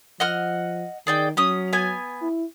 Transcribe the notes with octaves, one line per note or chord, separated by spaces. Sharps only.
F3 D#5 F#5 F6
D#3 G#4 D5 G5
F#3 C#4 D#6
B3 G#5
E4